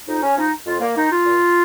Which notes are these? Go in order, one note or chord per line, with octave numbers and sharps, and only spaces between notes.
F2 D#4
C#4
F3 D#4
F2 F4
A#3
D#3 D#4
F4
A#2